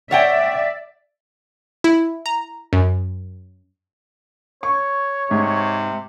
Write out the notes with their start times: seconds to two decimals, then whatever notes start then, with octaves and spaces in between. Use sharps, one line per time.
0.11 C#5 D5 E5 F#5 G5
1.84 E4
2.26 A#5
2.73 F#2
4.63 C#5 C#6
5.31 G#2 C3